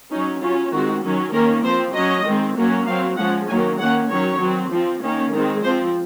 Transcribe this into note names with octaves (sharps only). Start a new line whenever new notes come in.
F#3 C#4 D#4
F#3 C#4 F4
D#3 G#3 C4 F#4
D#3 F#3 C#4
D#3 A#3 C#4 A#4
F3 C4 C5
F#3 C#4 D#5
D#3 G#3 C4
F#3 A#3 C#4
F#3 C4 F5
F3 G#3 C#4 F#5
D#3 F#3 A#3 C#4 G#5
D#3 A#3 C#4 F#5
D#3 F#3 C#4 C#5
F#3 C4
F3 C4
D#3 A#3 C#4
D#3 G#3 C4
F3 C4 C5